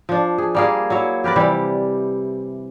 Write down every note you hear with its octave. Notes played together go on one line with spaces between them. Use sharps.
F3 D4
G#4
G3 A#3 G#4
F#3 E4 C#5
G4 A#4 B4 D5
C3 E3 G3